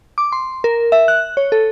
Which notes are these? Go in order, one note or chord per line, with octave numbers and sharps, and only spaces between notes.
D6
C6
A#4
E5
F#6
C#5
A4